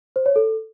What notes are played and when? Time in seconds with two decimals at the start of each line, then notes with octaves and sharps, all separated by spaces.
0.16 C5
0.26 C#5
0.36 A4